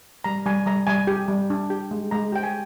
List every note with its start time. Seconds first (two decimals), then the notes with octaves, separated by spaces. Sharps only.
0.24 G3 A#5
0.46 G3 G#5
0.66 G3 A#5
0.87 G3 G#5
1.07 G4
1.28 G3
1.50 D4
1.70 G4
1.91 G#3
2.11 G#3 A#5
2.32 G4 G5
2.43 G#5